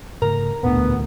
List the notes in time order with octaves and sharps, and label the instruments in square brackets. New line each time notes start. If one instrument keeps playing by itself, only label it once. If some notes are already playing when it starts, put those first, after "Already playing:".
[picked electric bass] G#2 C#3 A3 [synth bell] A#4 A#5
[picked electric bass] E1 A#2 D4 [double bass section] A1 D2 [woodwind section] B3